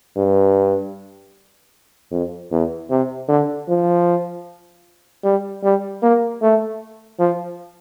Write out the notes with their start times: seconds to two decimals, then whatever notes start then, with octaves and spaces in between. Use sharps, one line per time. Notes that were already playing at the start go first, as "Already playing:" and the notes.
0.17 G2
2.11 F2
2.51 E2
2.90 C3
3.28 D3
3.69 F3
5.24 G3
5.63 G3
6.02 A#3
6.42 A3
7.19 F3